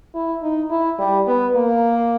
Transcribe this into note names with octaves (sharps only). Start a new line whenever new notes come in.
E4
D#4
E4
G3
B3
A#3